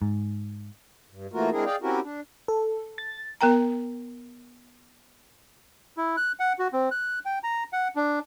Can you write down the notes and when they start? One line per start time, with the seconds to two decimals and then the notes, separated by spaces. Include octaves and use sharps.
0.02 G#2
1.10 G2
1.33 E3 A3 A#3 F4 F#4 A#4
1.51 G#3 C4 D4 E4 G#4 A#4
1.65 G#4 D5 D#5 F5 G5
1.82 C4 C#4 E4 F#4 G4 A#4
2.03 D4
2.48 A4
2.98 A6
3.41 B3 A#4 G5 A#5
5.97 E4
6.17 F#6
6.40 F#5
6.59 F#4
6.73 C4
6.91 F#6
7.25 G5
7.43 A#5
7.73 F#5
7.96 D4